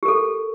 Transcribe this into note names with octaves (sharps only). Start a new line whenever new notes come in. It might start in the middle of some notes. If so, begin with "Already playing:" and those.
G4 A4 A#4